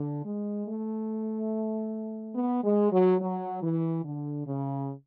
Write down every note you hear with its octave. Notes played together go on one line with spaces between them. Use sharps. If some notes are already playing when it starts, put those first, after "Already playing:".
Already playing: D3
G#3
A3
B3
G#3
F#3
F#3
E3
D3
C#3